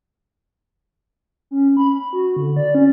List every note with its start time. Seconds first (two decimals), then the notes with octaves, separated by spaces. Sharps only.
1.51 C#4
1.77 B5
2.13 F#4
2.36 D3
2.57 D5
2.75 C#4